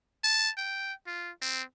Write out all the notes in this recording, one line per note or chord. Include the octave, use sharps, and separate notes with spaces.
A5
G5
F4
C4